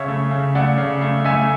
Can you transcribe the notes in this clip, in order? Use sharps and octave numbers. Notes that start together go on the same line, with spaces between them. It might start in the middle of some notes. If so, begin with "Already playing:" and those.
Already playing: C#3 C#5 E5
A3
C#3
A3 D5 F#5
C#3
A3
A3 E5 G#5